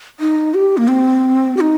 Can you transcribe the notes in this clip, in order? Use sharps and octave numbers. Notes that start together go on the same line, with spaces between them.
D#4
G4
A#3
C4
G4
D#4